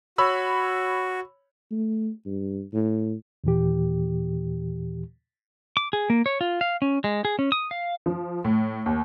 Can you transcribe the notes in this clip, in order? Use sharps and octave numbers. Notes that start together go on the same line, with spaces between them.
F#4 C#5 B5 E6
A3
G2
A2
D#2 A#2 E3 G4
D6
G#4
A#3
C#5
F4
F5
C#4
G#3
G#4
C#4
D#6
F5
F3
A2
D#2